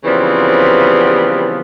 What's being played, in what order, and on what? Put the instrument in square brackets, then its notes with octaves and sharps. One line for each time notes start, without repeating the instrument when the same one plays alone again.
[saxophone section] C#3 E3 F3 G3 B3 C4